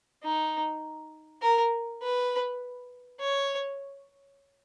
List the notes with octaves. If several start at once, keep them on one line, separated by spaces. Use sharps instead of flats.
D#4
A#4
B4
C#5